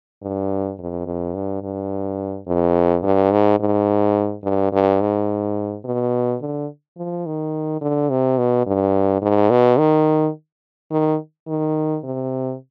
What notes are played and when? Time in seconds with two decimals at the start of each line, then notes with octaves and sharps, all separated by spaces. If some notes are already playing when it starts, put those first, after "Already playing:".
0.22 G2
0.79 F2
1.06 F2
1.34 G2
1.62 G2
2.47 F2
3.03 G2
3.32 G#2
3.60 G#2
4.44 G2
4.72 G2
5.01 G#2
5.85 B2
6.41 D3
6.97 F3
7.26 D#3
7.81 D3
8.10 C3
8.38 B2
8.66 G2
9.22 G#2
9.50 B2
9.78 D#3
10.91 D#3
11.48 D#3
12.04 C3